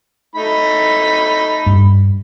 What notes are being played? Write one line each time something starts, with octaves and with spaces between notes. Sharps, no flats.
A3 D#4 B5
G2